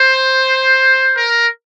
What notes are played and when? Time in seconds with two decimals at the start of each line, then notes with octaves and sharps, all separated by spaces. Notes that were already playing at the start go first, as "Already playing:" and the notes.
Already playing: C5
1.17 A#4